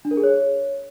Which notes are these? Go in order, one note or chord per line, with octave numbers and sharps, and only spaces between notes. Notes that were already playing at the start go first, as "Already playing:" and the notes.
D4
A#4
G#4
C#5